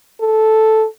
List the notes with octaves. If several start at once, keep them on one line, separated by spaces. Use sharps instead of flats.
A4